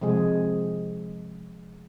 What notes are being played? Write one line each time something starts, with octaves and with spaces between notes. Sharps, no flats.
C3 F3 G#3 G#4